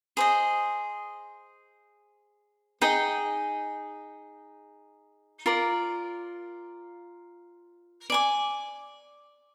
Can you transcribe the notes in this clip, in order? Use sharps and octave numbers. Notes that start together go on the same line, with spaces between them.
G#4 C5 D#5
D#4 G#4 D#5 G5
F4 A#4 D5
D5 G#5 D6